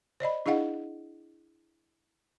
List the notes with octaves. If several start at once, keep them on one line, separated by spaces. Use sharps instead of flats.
C5 D5 D#5 B5
D4 E4 G#4 D#5 F5 F#5